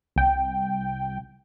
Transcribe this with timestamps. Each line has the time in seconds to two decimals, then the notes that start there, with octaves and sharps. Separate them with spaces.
0.16 C2 G5